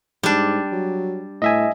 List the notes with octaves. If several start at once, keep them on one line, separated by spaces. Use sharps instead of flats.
G#2 G3 D4
F#3
A2 D#5 E5 G#5